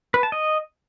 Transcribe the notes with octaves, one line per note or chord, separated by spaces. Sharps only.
B4
A5
D#5